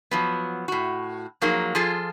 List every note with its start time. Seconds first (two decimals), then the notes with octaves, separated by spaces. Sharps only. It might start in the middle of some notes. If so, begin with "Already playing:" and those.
0.11 F3 F#3 B3
0.68 A2 F#4
1.41 F3 F#3 A#3 D#4 G#4
1.75 F3 F4 G#4 A4